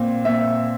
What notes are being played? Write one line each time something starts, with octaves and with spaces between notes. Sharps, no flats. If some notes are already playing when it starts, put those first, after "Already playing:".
Already playing: A#2 C4
A#2 E5